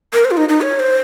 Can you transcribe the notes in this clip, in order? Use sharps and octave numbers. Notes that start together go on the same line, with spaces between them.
A#4
C5
F4
D#4
D#4
C#5
C5